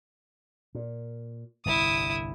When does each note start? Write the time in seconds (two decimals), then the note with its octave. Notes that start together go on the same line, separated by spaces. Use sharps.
0.75 A#2
1.65 G1 C2 A2 E4 D#6